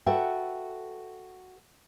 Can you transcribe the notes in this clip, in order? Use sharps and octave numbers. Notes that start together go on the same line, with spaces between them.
F#4 A4 B4 E5 F#5 G5